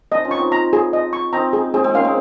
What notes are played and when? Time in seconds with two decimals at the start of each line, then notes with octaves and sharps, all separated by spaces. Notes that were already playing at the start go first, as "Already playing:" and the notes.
0.11 C4 D#4 D#5
0.25 C#4 F4
0.31 C#6
0.38 C4 D#4
0.52 A#5
0.73 G#4
0.93 D#5
1.13 C#6
1.33 C4 D#4 A#5
1.53 G#4
1.74 C4 D#4 G#4
1.84 G#3 C4
1.94 A#3 C#4 F5
2.04 G#3 C4